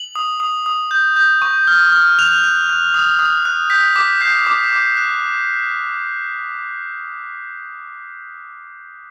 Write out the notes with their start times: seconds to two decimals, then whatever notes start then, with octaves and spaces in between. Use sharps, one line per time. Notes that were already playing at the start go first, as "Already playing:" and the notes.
Already playing: F#7
0.15 D#6
0.40 D#6
0.66 D#6
0.91 G6
1.16 G6
1.42 C#6
1.67 F6
1.92 F6
2.18 F#6 F7
2.44 F#6
2.69 F#6
2.94 D#6
3.19 D#6
3.45 F#6
3.70 G6 B6
3.96 D6 B6
4.21 G6 C7
4.47 D6
4.72 D6
4.97 F#6